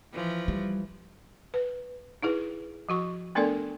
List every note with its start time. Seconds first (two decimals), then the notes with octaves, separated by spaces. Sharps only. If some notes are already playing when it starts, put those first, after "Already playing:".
0.13 E3 F3
0.48 G3
1.54 B4
2.23 D#4 E4 G#4 B4
2.89 F3 F#4 C#6
3.35 A3 B3 D4 A4 A#4 D5